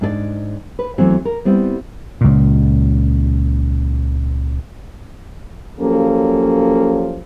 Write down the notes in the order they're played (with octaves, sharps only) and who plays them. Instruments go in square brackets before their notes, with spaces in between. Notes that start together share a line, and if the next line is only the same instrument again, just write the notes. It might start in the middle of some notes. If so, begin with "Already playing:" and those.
[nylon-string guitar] G#2 D4 G#4 D5
B4
E2 E3 F#3 A3 C4 F#4
A#4
G3 B3 C4 E4
[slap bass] C#2 A#2
[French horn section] F3 F#3 A#3 C#4 G4 A4